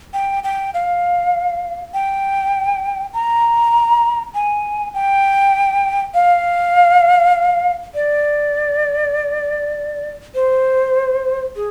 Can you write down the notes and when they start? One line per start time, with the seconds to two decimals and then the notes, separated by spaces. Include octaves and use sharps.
0.14 G5
0.44 G5
0.74 F5
1.94 G5
3.14 A#5
4.34 G#5
4.94 G5
6.14 F5
7.95 D5
10.35 C5
11.56 G#4